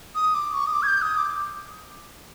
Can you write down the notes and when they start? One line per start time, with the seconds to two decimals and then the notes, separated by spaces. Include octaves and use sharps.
0.15 D#6
0.34 D6
0.54 C#6
0.67 D#6
0.73 D6
0.83 G#6
0.87 G6
1.02 D#6
1.17 D6